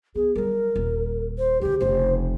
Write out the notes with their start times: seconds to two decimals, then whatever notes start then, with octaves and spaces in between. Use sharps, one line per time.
0.15 B3 G#4
0.36 F#3 G3 A#4
0.76 D#1
1.38 C5
1.62 D2 C#3 G4
1.81 F1 C#3 C5